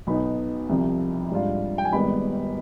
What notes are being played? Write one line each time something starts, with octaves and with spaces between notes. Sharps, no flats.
B1 B2 B3 D#4 B5
C2 C3 F3
G#2 G3 D4 F4
G5
G#5
G#1 G#2 G3 B3 B5